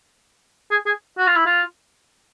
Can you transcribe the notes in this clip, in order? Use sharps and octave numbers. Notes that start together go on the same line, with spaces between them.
G#4
G#4
F#4
F4
E4
F4